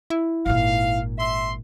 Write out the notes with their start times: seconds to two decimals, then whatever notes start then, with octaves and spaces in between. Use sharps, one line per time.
0.10 E4
0.46 G#1 A#2 F5
1.17 E5 C6